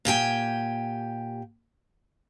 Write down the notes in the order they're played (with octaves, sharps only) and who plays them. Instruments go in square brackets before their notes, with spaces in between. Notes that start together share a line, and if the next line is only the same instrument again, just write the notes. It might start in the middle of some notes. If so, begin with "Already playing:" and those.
[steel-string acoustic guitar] A#2 G4 G5 G#5